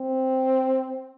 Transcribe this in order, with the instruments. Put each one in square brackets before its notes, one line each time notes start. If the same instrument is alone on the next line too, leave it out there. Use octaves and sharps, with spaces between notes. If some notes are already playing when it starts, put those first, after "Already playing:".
Already playing: [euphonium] C4